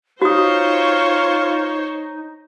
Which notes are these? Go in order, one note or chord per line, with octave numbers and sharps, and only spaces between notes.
D#4 F4 F#4 C5 C#5 D#6